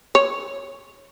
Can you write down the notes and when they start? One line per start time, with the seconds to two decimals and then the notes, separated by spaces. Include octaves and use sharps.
0.15 C#5